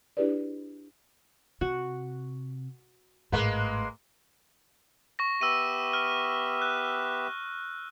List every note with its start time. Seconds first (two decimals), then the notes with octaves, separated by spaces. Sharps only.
0.17 D4 E4 G4 G#4 B4 D5
1.61 C3 F#4
3.32 G#1 A2 G#3 A#3 B4
5.19 C#6 A#6
5.41 B3 G4 E5 E6 D#7
5.93 F6
6.62 F#6